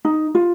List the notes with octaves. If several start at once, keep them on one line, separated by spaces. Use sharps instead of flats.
D#4
F4